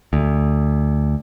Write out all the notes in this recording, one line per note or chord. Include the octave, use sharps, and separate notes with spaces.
D2